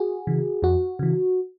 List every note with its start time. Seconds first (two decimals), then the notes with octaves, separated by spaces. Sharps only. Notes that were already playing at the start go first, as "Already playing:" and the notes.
Already playing: F#4 G#4
0.27 C#3 E3
0.62 F2 F#4
0.99 C#3 E3